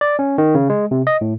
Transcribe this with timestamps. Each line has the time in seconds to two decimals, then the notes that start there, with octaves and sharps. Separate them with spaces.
0.01 D5
0.19 C#4
0.38 D#3
0.55 C#3
0.70 G#3
0.91 C3
1.07 D#5
1.21 A2